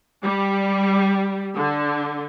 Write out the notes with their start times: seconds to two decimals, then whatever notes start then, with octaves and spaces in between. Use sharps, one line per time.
0.23 G3
1.56 D3